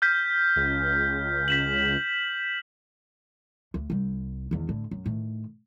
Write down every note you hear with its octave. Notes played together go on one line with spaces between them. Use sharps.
F6 G6 B6
C#2
B6 E7 F#7
D2
C2 G3
E2 D#3
A2 D3
F#2
A2 D#3